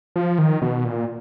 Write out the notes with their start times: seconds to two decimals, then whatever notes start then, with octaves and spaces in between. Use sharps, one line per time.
0.16 F3
0.38 D#3
0.62 B2
0.84 A#2